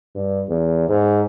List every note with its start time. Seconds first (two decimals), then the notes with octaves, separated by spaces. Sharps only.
0.15 G2
0.48 E2
0.88 G#2